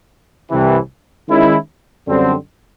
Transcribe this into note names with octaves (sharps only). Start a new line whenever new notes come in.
C2 C3 E3
D#3 G#3 C#4 E4
F#2 D3 G3 C4